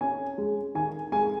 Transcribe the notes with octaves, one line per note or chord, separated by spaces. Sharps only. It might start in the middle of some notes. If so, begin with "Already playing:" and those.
C#4 G#5
G#3
D#3 G#5
G#3 G#5